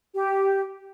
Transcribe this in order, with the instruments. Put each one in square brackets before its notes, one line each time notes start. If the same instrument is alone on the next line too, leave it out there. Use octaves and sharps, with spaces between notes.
[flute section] G4